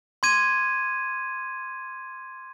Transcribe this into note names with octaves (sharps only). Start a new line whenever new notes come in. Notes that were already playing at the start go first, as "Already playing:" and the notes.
C6 D6 G#6 D#7